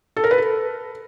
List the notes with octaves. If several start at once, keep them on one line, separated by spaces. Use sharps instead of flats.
A4
A#4
B4
A4